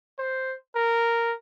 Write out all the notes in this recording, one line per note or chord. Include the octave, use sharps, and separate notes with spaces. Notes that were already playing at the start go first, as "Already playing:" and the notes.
C5
A#4